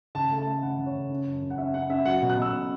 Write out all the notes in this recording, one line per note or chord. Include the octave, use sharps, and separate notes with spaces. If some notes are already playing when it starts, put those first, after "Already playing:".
C#3 A5
A3
A5
A3
C#3 F#5
C#3
C#5
C#3
C#4
F#2
C#3
F#5
C#4 E5
C#4 F#5
C#4 E5
F#3 F#5
B2
F#6
B2 E6
C#4